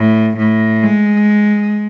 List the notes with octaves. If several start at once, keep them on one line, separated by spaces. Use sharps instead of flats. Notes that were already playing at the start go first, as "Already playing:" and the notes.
Already playing: A2
A2
G#3